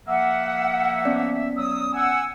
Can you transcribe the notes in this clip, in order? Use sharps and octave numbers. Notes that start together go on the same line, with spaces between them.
F3 A#3 E5 F#5
B3 C#4 D5
F#3 D#6 E6
F#5 G#5 E6